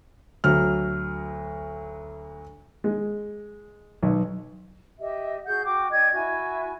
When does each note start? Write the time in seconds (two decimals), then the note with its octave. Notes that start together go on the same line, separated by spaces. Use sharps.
0.44 D2 F#3 F6
2.84 G#3
4.03 B1
4.99 G4 D#5 E5
5.46 F#4 G#4 F#5 G6
5.65 F#4 G5 D6
5.90 D4 D#5 G5 G#6
6.13 E4 F#4 E5 G#5